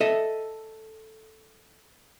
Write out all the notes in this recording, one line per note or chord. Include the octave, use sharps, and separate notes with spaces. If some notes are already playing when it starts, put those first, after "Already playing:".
A4 D#5 E5